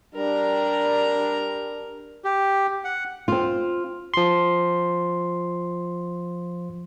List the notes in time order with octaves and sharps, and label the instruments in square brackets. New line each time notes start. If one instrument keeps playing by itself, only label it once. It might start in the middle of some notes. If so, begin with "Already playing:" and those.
[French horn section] G3 D4 [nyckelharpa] A#4 A#5
[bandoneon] G4
F#5
[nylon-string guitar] C4 F4
[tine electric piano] F3 C6